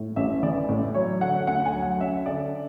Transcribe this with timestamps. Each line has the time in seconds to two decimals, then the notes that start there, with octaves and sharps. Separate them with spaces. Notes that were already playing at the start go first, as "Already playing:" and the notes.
Already playing: A2
0.16 A1 E5
0.43 E3 D5
0.69 A2 D5
0.94 F#3 C#5
1.21 D3 F#5
1.47 D2 F#5
1.66 G#5
1.74 F#3
1.83 F#5
2.00 C#4 E5
2.26 D3 D5